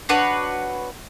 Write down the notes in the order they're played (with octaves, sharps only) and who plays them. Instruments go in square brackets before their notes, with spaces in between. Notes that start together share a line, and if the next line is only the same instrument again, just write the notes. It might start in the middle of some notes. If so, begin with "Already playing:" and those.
[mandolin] D4 F#4 B4 C#5